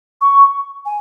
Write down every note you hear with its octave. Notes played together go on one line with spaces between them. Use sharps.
C#6
G#5